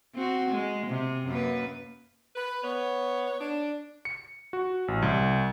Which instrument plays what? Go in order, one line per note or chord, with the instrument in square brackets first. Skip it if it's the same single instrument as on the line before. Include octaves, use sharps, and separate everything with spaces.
[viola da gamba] C4 F#4
G#3
C3
F#2 A#3 B4
[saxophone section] B4
[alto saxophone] B3 [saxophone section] C#5
[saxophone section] D4
[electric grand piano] C#7
F#4
A1
C2